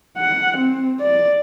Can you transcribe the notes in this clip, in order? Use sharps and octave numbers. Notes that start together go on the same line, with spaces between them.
F#5
C4
D5